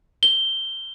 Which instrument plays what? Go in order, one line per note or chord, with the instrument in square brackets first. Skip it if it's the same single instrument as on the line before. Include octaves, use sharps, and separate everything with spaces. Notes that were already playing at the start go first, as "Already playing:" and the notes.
[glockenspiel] G7